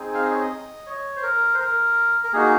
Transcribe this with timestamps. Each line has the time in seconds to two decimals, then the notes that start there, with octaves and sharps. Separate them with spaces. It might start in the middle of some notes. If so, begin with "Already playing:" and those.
Already playing: C4 D#4 G#4
0.14 F5
0.22 D#5
0.32 C#5
0.40 D#5
0.87 C#5
1.16 C5
1.23 A#4
1.54 C5
1.60 A#4
2.24 A#4
2.33 A#3 D#4 F#4 G#4